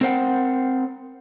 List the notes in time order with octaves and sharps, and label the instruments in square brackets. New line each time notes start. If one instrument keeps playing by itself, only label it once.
[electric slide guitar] C4 A#4 C5 F#5 G5